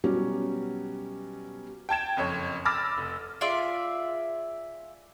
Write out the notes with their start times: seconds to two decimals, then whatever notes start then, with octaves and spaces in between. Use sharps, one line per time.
0.04 B2 F#3 G3 C#4
1.89 G5 A5 G#6 E7
2.17 F#1 F2 C#5
2.65 B5 D6 E6 F6 A6 A#6
2.97 F1
3.41 F4 G#4 D5 E5